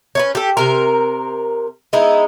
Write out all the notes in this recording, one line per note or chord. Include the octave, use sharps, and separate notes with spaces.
C#4 D#4 B4
G4 A4
C3 A#4
G#3 B3 D#4 E4